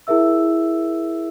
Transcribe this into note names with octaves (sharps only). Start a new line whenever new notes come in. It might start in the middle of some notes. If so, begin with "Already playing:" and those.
E4 G#4 A#4 E5 E6